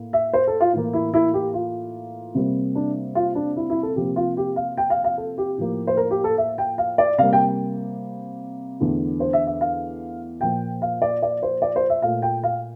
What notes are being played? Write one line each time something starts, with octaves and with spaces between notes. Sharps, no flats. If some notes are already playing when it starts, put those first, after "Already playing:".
Already playing: A2 A#3
E5
C5
A4
F4
A2 E3 A#3
E4
E4
G4
F4
C3 G3 A#3
D4
F4
D4
E4
E4
A4
C3 F3 A#3 G4
F4
G4
F5
G5
F5
F5
A4
G4
A2 F3 A#3
C5
A#4
G4
A4
E5
G5
F5
D5
C3 G3 A#3 F5
G5
E2 D3 A3
C5
E5
E5
F5
A#2 F3 A#3 G5
F5
D5
D5
C5
D5
C5
E5
A#2 A3 F5
G5
F5